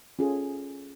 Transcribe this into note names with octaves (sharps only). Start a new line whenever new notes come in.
C#4 F4 G#4 A4